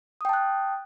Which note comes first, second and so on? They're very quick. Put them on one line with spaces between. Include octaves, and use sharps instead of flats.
D#6 G5 A5 F#6